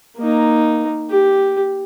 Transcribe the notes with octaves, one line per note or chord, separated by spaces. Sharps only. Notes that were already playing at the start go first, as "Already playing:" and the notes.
A#3 D#4
G4